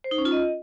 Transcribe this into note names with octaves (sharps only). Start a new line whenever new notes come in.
C5
D#4
C#4
F4
D#5